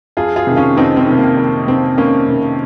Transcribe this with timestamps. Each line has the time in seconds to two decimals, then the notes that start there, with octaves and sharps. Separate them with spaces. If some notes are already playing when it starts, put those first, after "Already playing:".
0.17 F2 F4 G#4
0.36 F4 G#4
0.47 C3 D#3
0.56 C#4 F4
0.76 F2 C4 D#4
0.97 C4
1.07 C3 D#3
1.18 A#3
1.37 F2
1.67 C3 D#3 C4
1.97 F2 A#3 C#4
2.28 C3 D#3